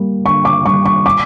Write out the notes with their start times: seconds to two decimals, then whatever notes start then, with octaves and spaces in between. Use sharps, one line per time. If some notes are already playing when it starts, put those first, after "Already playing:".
Already playing: G3 A#3
0.25 D3 C#6
0.45 D6
0.66 G3 C#6
0.86 C#6
1.06 D6